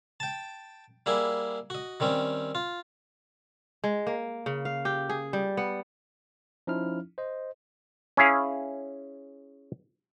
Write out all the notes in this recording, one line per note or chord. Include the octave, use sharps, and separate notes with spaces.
G5 A5
G3 A#3 E4 G#4
F#4 D#5
D#3 G3 C4 C#4
F4
G#3
A#3
C#3
F5
G4
G#4
G3
B3
F3 C#4 D#4 E4 F6
C5 D#5
C#4 E4 G#4 F5